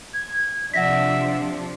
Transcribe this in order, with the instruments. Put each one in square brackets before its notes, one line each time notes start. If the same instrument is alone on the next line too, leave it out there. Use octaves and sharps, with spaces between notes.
[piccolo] G#6
[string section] C3 F3 D4 [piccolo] E5 [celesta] F#5 A#6 B6